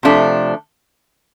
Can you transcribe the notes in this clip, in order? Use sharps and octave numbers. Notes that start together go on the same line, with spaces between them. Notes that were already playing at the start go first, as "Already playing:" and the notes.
C3 F3 A3 D4